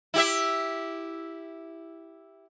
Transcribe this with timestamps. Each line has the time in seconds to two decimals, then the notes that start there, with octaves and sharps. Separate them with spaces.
0.14 E4 G4 E5